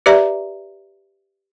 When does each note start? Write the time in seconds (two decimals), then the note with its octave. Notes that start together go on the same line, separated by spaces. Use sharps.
0.06 G4 B4 D5 E5 A#5